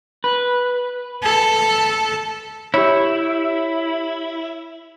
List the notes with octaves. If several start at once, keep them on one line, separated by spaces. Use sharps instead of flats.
B4
A4
E4 G4 C#5